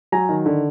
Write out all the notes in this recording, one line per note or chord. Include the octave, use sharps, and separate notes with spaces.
F#3 G#5 A#5
D#3
D3